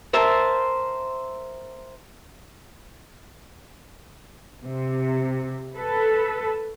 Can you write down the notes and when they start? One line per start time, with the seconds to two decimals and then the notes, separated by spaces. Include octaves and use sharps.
0.13 A#4 C5 E5 A5
4.62 C3
5.76 A4 B4